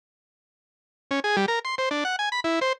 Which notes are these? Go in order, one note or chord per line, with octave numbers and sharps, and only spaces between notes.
C#4
G#4
G3
A#4
C6
C5
D4
F#5
G#5
B5
E4
C5